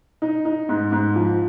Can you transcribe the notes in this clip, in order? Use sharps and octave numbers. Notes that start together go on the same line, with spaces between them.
D#4
D#4
G#2
G#2
F3